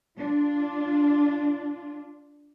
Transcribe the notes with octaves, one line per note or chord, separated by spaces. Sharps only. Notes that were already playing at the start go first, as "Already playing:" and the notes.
D4 F4